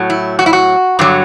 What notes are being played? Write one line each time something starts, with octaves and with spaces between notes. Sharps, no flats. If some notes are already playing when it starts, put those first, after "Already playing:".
Already playing: A2 F#3
E4
F#4
E4
F#4
G2 D3 F#3